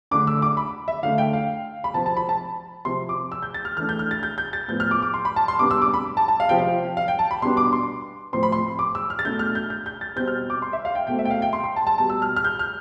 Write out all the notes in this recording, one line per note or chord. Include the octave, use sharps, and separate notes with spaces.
D3 A3 D4 D6
E6
D6
B5
E5
D3 A3 D4 F5
G5
F5
B5
C3 F3 C4 A5
A5
B5
A5
C3 F3 C4 C6
D6
E6
G6
A6
F6
E3 A3 D4 F6
G6
F6
A6
G6
G6
A6
A2 F3 B3 G6
F6
D6
D6
C6
B5
A5
C6
C3 G3 B3 D4 D6
E6
D6
B5
A5
A5
F5
C3 F3 C4 G5
F5
F5
G5
A5
B5
B2 G3 B3 D4 C6
D6
C6
A2 F3 C4 C6
B5
C6
D6
E6
F6
A6
B2 A3 D4 G6
F6
G6
G6
G6
A6
B2 G3 C4 G6
F6
D6
C6
E5
F5
G5
B2 A3 C4 G5
E5
G5
F5
G5
C6
C6
A5
A5
B2 G3 B3 A5
E6
F6
F6
G6
F6